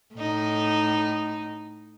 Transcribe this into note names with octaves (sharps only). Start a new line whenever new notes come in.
A2 D#4